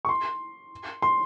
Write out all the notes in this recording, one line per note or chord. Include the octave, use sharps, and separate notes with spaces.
C#6
C6
C6